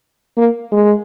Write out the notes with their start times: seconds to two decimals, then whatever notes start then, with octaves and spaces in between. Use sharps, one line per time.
0.38 A#3
0.72 G#3